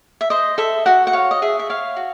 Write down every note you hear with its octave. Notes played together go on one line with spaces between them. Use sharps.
E5
C5 D#5
A4 E5
F#4 F#5
F#5
C#5 F5
D#5
G#4 E5
E5
C#5 F5
F#4